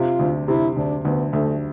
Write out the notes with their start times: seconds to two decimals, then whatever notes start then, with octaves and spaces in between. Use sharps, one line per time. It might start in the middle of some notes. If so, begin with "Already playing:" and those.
Already playing: C3 F4
0.19 D2
0.48 C3 E4
0.77 D2 D4
1.05 D2 B3
1.33 D2 A3